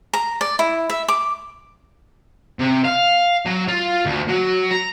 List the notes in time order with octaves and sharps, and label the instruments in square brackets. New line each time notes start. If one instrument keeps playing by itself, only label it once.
[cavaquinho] A#5
D5
E4
E5
D6
[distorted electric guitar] C3
F5
F#3
F4
D2
F#3
A#5